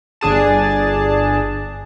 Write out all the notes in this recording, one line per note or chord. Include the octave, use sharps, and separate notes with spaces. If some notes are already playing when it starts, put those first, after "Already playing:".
G1 D4 G#4 A5